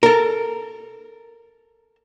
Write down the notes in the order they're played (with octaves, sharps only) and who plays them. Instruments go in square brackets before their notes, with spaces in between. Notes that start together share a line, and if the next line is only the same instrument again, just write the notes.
[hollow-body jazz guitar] A4 A#4